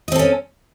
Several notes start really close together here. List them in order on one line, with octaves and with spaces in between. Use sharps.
D#5 C4 A4 C#4